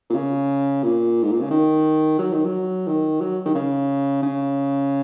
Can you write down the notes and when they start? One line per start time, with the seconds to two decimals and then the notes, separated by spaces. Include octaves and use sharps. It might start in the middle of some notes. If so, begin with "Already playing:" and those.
0.10 A#2
0.15 C#3
0.83 A#2
1.23 G#2
1.32 A#2
1.41 C#3
1.51 D#3
2.19 F#3
2.33 D#3
2.45 F#3
2.87 D#3
3.20 F#3
3.46 D#3
3.55 C#3
4.22 C#3